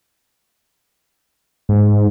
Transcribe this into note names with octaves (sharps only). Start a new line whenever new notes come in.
G#2